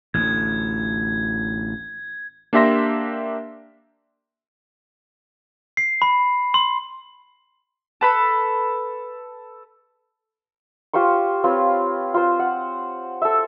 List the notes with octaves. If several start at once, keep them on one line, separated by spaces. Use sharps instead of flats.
A1 D2 G#6
A#3 D4 G4 E5 C6 A#6
C7
B5
C6
A4 B4 B5
F4 G4 C5 C#6
C4 F4 B4 C#5
F4 C5
F#5
A4 E5